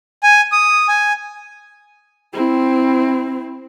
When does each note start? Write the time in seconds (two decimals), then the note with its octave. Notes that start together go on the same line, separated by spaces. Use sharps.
0.23 G#5
0.52 D#6
0.88 G#5
2.33 C4 E4